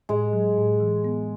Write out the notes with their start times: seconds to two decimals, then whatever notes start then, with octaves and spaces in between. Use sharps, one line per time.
0.09 A2 G#3
0.33 F#3
0.58 A2
0.80 E3
1.05 B3